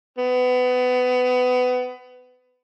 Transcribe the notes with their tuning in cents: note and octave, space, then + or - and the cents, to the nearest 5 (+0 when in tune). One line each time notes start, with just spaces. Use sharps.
B3 +25